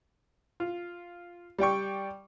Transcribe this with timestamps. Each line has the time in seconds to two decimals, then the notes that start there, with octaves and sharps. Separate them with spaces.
0.60 F4
1.58 G3 D5 G5 C#6